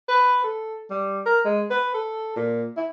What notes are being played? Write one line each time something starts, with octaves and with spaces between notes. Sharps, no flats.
B4
A4
G3
A#4
G#3
B4
A4
A#2
E4